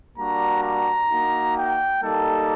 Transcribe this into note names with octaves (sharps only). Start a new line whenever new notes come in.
G3 A#3 D4 F#4 A#5
A#5
A#3 D#4 F#4
G5
G3 A#3 D#4 G4 A4